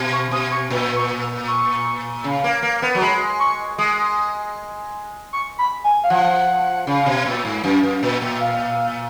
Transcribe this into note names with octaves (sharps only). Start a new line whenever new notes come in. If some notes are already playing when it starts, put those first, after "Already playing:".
Already playing: B2
C#6
B2 D#6
C#6
A#2
C#6
C#6
C#3
A#3
A#3
B3
F#3
G#3 B5
C#6
G#3 D#6
C#6
B5
G#5
F5
F3 F#5
C#3
B2
A#2
G#2
F#2
F#2
A#2
A#2
F5